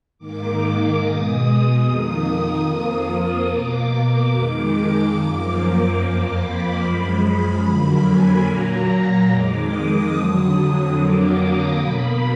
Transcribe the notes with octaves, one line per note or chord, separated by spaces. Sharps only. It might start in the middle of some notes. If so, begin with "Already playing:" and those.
G#2 D#3 A#3 D6
B2 G#3 D#6
F2 D#3 A#3 D#6
F2 F3 A#3
B2 A#3 D6
F2 D#3 G#3 D6
F#2 F3 A#3 D6
D6
F2 F3 A#3
B5
F#2 F3 G#3
B5
F2 D3 F#3 A#3
G#5
A#2 F#3 A#3 A#5
A#5
F2 D#3 G#3 D6
D#6
F2 D3 F#3
F2 D3 F#3 A#3 D6
D#6
B2 A#3 B5